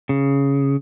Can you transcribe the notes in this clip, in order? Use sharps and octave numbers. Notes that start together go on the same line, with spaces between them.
C#3